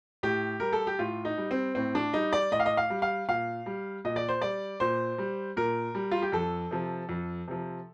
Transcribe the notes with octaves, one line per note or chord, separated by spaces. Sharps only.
A2 G4
G3 A#4
A4
G4
A2 F4
D#4
G3
C4
A2 C4
D4
G3 D#4
D5
A2 D#5
F5
D#5
F5
G3
F5
A#2 F5
G3
A#2 D#5
D5
C5
G3 D5
A#2 C5
G3
A#2 A#4
G3
F4
G4
F2 A4
C3 F3
F2
C3 F3